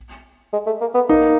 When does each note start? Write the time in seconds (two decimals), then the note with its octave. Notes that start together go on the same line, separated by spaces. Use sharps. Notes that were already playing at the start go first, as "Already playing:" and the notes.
0.53 G#3
0.67 A3
0.81 A#3
0.94 B3
1.09 A#3 D#4